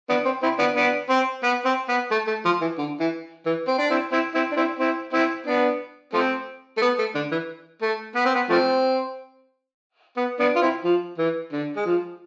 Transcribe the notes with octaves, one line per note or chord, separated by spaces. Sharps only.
B3 D4
C4
C4 E4
B3 D4
B3 D4
C4
B3
C4
B3
A3
A3
F3
E3
D3
E3
E3
C4
D4
C4 E4
C4 E4
C4 E4
D4
C4 E4
C4 E4
C4 E4
B3 D4
F3 A3 C4
A3
B3
A3
D3
E3
A3
B3
C4
B3
F3 A3 C4
B3
B3 D4
F4
C4 E4
F3
E3
D3
G#3
F3